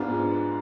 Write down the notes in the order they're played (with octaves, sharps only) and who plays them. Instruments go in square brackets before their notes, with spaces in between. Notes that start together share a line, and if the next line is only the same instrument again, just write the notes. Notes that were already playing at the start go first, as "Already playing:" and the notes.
Already playing: [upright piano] G#2 G#3 B3 D4 F4